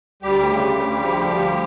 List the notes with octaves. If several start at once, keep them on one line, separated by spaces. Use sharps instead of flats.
D2 G3 G4
C#3
D2
F3
D2